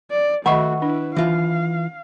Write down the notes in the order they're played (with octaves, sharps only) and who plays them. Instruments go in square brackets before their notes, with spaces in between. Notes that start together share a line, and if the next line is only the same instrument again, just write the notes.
[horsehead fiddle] D5
[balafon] D#3 D#5 B5 [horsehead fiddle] A3 F#4 [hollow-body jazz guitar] E5 [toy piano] F#5 C#6
[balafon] D4 [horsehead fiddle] E4 B4
[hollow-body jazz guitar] E3 F4 [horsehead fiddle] F5